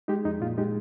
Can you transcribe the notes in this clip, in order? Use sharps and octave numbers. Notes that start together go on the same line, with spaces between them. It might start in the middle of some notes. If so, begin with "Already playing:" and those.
G#3 D#4 G4
F2 D#4
A#2 F4
G#3 D#4 G4